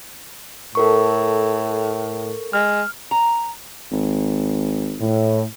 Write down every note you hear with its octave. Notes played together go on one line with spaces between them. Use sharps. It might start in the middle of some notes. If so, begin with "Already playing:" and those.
A2 A4 A#4 C#6
G#3 F6
A#5
G#1
A2